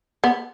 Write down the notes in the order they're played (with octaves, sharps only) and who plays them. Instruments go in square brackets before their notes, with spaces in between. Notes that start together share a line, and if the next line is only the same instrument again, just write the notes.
[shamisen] B3